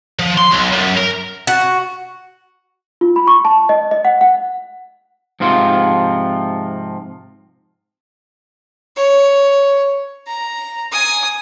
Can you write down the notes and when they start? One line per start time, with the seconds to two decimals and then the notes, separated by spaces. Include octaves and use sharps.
0.19 F3
0.37 C6
0.51 B1
0.72 F#2
0.97 A#4
1.47 F#4
3.01 F4
3.16 B5
3.27 C#6
3.45 A5
3.69 D#5
3.91 D#5
4.05 F#5
4.21 F#5
5.40 G#2 C3 F3 F4
8.96 C#5
10.27 A#5
10.92 G#5 D#6